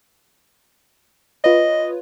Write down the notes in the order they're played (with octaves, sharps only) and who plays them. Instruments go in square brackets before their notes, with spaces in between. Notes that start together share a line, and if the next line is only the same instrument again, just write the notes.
[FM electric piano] F4 B4 C#5 [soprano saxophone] D#5